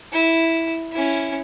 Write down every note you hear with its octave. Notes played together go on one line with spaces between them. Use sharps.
E4
C#4 E4